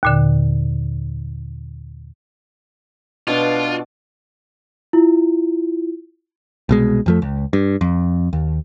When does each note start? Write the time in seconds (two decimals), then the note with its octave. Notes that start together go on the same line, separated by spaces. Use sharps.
0.03 D#2 A#2 D3
3.27 B2 D4 F4 B4
4.93 E4 F4
6.69 C2 B2 G#3
7.06 F2 F3 A3
7.22 C#2
7.53 G2
7.81 F2
8.33 D#2